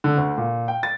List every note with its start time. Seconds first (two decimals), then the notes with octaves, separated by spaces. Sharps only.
0.04 D3
0.17 D2
0.38 A#2
0.68 G5
0.83 A6